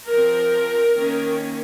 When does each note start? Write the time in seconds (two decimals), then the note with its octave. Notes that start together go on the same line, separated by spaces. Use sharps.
0.11 F3 C4 A#4
0.94 D#3 A#3 C#4